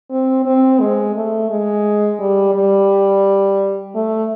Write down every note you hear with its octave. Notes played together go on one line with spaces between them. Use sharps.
C4
C4
G#3
A3
G#3
G3
G3
A3